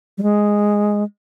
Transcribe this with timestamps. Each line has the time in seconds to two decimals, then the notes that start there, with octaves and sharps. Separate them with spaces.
0.18 G3
0.23 G#3